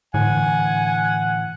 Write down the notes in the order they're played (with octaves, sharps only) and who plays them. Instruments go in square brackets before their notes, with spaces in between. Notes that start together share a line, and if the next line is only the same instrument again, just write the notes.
[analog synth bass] A2 [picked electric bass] D3 E3 [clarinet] F#5 [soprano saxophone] G#5